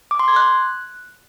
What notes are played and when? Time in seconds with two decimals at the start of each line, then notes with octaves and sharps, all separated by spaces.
0.11 D6
0.19 C6
0.28 G#6
0.36 F#6